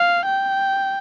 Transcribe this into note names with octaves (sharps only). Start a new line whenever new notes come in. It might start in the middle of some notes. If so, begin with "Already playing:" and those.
Already playing: F5
G5